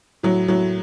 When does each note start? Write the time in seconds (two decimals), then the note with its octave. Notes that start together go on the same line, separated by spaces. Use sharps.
0.23 A2 F#3
0.48 A2 F#3